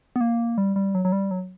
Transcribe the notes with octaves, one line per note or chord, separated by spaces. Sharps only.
B3
A#3
G3
G3
F#3
F#3
G3
F#3